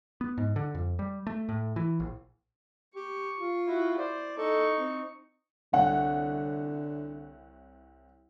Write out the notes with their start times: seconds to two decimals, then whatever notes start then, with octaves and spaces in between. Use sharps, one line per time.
0.21 B3
0.38 G#2
0.56 D3
0.75 F2
0.99 G3
1.27 A3
1.49 A2
1.76 E3
2.00 A#1
2.95 G4 C#6
3.39 F4
3.67 E4 F#4
3.98 C5 D5
4.38 D#4 A4 C#6
4.78 C4
5.73 C2 D3 C#5 F#5